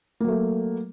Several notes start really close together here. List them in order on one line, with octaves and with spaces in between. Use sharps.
A#3 F#3 A3